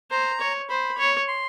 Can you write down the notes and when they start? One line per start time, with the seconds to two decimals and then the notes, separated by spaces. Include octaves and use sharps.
0.11 C5 A#5
0.41 C#5
0.69 C5 B5
0.98 C#5
1.28 C6